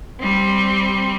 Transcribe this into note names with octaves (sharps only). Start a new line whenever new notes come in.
G3 C4